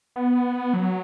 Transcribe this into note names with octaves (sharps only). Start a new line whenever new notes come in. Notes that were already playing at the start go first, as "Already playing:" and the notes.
B3
F#3